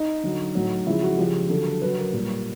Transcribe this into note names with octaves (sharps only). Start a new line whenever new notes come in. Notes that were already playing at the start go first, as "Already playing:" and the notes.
Already playing: D#4
D3 F#3
A2 F#3
C#3 F3 G#3 E4
F#4
C#3 F3 G#3 G4
D3 F#3 A4
A4
C#3 F#3 B4
A#4
A#2 G3